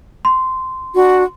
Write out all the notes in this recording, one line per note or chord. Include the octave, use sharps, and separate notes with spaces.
C6
D4 F#4